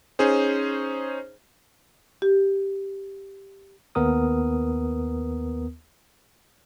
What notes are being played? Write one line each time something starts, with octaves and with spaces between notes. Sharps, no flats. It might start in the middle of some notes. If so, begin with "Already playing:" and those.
C#4 D#4 G#4 C5
G4
D#2 B3 A#4 D#6